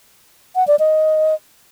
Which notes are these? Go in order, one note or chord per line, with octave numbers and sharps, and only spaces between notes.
F#5
D5
D#5